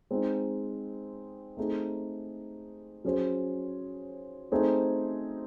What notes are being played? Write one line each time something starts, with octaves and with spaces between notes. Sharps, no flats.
G#3 C4 D#4
A3 C4 D#4 G#4
F#3 C#4 G#4 C5
A3 C4 D#4 G#4 C5